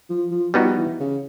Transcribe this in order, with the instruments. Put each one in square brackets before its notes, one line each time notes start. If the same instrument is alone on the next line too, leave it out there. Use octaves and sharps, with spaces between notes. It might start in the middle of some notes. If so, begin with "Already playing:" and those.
[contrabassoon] F3
F3
[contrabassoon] F3 [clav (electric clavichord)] G3 B3 D#4 F#4
[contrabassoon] E3
C#3